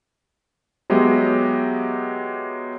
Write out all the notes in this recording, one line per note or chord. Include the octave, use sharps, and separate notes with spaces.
F#3 G#3 B3 G4 D#5 E5